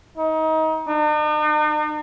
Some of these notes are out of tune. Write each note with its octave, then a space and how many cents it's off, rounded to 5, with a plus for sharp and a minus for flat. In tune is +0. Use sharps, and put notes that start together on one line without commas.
D#4 +25
D#4 -45